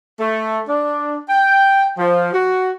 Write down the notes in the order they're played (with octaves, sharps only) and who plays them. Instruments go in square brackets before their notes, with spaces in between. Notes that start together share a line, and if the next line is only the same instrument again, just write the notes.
[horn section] A3
D4
G5
F3
F#4